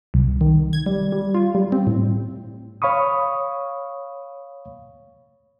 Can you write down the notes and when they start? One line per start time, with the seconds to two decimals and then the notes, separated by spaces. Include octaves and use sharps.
0.14 C2
0.41 D#3
0.73 G#6
0.86 G3
1.12 G3
1.34 F4
1.55 G3
1.72 C4
1.87 A2
2.82 C#5 F5 B5 C#6 D#6